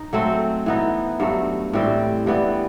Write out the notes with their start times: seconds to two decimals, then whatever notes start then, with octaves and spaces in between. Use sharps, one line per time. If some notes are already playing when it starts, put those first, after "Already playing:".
Already playing: D#4
0.13 F#3 A3 C4
0.66 E3 B3 D#4
1.20 G2 F#3 A3
1.73 A2 E3 G3 C4
2.26 G2 E3 G3 B3